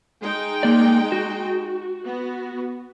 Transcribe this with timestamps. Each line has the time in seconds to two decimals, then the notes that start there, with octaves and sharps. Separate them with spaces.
0.22 G#3 D#4 G5
0.63 A#3 D5
1.12 F#4
2.05 B3